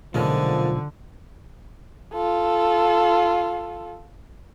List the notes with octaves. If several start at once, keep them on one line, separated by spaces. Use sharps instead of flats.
B1 A#2 D3 F3 G#3
F4 A4